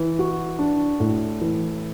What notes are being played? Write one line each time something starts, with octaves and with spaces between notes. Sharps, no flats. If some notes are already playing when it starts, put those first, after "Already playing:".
Already playing: E3
F#4
D4
A2
E3